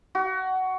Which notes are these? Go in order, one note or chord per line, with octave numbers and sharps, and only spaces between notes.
F#4